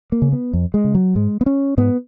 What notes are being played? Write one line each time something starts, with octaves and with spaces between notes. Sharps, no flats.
A#3
C#3
B3
F2
G#3
C#3
F#3
G#2 G#3
B3
C#4
G#2 B3